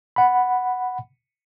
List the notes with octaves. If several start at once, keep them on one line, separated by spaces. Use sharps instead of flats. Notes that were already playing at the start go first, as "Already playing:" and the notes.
F#5 B5